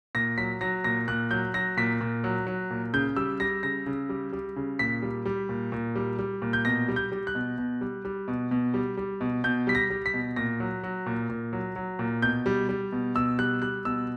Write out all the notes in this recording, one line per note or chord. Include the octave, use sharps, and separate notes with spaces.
A#2 A#6
F#3 B6
F#3 A#6
A#2 A#6
A#2 F#6
F#3 G6
F#3 A#6
A#2 B6
A#2
F#3
F#3
A#2
C#3 G6
G3 E6
G3 A#6
C#3 A#6
C#3
G3
G3
C#3
A#2 B6
G3
G3
A#2
A#2
G3
G3
A#2
G6
B2 A#6
G3
G6
G3
F#6
B2
B2
G3
G3
B2
B2
G3
G3
B2
B2 G6
G3 B6
A#6
G3
B6
B2
A#2 A#6
F#3
F#3
A#2
A#2
F#3
F#3
A#2
B2 G6
G3
G3
B2
B2 E6
G3 F#6
G3 F#6
B2 E6